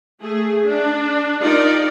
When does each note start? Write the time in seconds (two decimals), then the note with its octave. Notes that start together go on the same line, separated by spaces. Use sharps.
0.21 A3 G#4
0.66 D4
1.42 D#4 F4 G4 A#4 D5